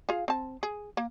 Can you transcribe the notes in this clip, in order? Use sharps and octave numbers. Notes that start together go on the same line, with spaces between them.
F4 G#4 F5
C4 A5
G#4
A#3